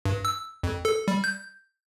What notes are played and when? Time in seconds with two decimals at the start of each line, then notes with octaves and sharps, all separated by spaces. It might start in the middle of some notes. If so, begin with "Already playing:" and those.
0.05 G2
0.25 E6
0.63 F2
0.85 A4
1.08 G3
1.24 G6